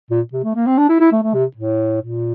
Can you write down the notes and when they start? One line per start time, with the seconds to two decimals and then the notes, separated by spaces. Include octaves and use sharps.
0.11 A#2
0.33 C3
0.44 A3
0.55 A#3
0.67 C4
0.78 D4
0.89 E4
1.00 E4
1.12 A3
1.22 A3
1.34 C3
1.56 A2
2.01 A#2